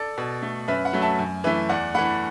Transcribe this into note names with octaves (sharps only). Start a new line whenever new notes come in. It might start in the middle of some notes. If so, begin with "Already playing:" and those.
Already playing: A4 D5
B2
A3
F#2 B4 E5
F#5 B5
F#3 A3
E5 A5
F#2
E3 A3 B4 E5
E2 D5 F#5
E3 A3 F#5 B5